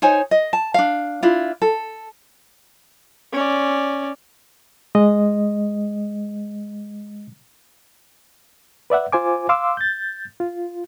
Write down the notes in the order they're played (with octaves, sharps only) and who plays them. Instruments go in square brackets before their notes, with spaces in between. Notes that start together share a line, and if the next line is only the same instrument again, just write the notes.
[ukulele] D#4 C5 C#5 G#5
D#5
A5
D4 F5
D4 E4 F4
A4
[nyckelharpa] C#4 D5
[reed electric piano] G#3 D#5
B4 D5 E5 F#5
F4 C5 G#5 D6
F5 C6 D6 E6
G6 A6
F4